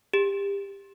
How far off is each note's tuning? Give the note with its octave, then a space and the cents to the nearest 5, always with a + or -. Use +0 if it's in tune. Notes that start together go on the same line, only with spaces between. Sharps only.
G4 +25